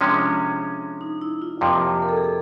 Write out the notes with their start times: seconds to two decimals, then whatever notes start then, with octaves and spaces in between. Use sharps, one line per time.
0.01 C3 F3 G#3 C#4 D4
1.01 D#4
1.21 E4
1.42 F4
1.61 F2 C3 F3 A#3 G4
2.02 A#4
2.09 A4
2.17 G#4
2.24 A4